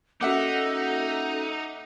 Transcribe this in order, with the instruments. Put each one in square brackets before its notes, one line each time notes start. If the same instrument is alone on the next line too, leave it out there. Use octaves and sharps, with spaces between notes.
[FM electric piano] A#3 C#4 F#4 [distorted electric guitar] D#4 [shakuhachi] A4 [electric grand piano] E5 F#5 D6